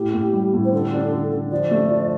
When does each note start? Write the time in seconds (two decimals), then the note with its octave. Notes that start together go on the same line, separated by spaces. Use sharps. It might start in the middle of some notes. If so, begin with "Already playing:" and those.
Already playing: A2 G4
0.13 A2
0.33 G3
0.54 A2
0.65 C5
0.72 D3 A4
0.93 D4
1.11 D3
1.31 D3
1.51 F3 D5
1.71 A3
1.90 F3